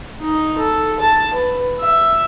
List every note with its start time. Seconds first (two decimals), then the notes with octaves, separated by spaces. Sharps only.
0.21 D#4
0.58 A4
1.00 A5
1.34 B4
1.80 E5